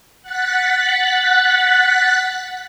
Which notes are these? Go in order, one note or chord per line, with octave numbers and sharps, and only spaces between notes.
F#5 F#6 A6 B6